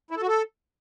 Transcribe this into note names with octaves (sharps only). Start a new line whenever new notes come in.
E4
A4
F#4
A4